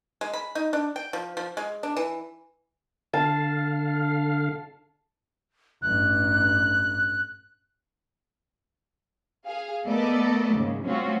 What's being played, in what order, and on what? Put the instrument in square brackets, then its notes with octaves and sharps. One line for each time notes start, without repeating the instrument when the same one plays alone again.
[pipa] G#3
B5
D#4
D4
G5
F3
F3
G#3
D4
E3
[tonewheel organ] D3 F5 [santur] A5
[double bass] A1 G2 [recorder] F#6
[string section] G#4 F5
A3 B3 A4 A#4 D5 D#5
D#2 G#2 C#3
G3 A3 C4 C#4 F4 F#4